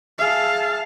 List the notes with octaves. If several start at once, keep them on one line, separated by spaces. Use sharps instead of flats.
G#4 E5 F5 A5